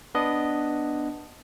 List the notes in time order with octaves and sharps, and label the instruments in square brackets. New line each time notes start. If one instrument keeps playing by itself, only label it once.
[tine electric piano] B3 D4 D#5